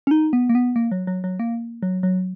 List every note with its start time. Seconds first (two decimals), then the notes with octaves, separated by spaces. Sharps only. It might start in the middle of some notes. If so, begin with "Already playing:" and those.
0.07 C#4
0.11 D#4
0.33 B3
0.49 A#3
0.55 B3
0.76 A#3
0.92 F#3
1.07 F#3
1.24 F#3
1.39 A#3
1.83 F#3
2.03 F#3